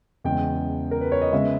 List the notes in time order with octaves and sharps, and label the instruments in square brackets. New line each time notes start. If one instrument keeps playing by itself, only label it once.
[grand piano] E2 C#3 G#3 G5
A#4
B4
C#5
D#5
C#3 G#3 B3 E5